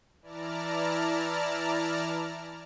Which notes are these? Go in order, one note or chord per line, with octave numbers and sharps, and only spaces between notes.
E3 E4 D5 A5 A#5 F6